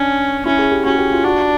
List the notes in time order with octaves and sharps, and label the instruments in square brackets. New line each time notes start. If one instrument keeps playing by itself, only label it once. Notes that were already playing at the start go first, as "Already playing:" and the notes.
Already playing: [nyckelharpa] C#4 [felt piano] D4
[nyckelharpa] C#4 [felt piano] E4
[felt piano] G#4
G4
[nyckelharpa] C#4 [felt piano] F#4
[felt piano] G4
F4
[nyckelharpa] D4 [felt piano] F#4